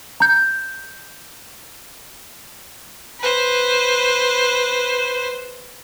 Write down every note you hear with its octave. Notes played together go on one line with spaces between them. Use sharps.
A#5 G6
B4 C5